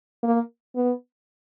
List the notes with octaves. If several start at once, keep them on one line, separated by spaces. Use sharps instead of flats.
A#3
B3